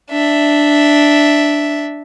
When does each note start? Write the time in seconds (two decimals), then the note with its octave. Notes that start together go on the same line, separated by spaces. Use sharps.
0.11 D4 E5